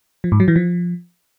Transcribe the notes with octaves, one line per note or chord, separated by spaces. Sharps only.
F3
G#2
F#3
E3
F3